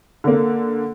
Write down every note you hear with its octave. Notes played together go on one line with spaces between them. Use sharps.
D3 A#3